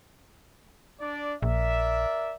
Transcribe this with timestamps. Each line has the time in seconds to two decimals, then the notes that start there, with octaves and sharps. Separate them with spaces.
1.00 D4 D5
1.42 A#1 A#4 D5 E5